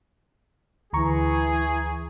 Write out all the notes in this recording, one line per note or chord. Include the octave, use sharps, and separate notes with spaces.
D2 E3 G#4 A#5 C#6